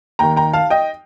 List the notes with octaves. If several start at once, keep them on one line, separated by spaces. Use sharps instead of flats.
D#2 D#3 G5 A#5
G5 A#5
F5 A5
D#5 G5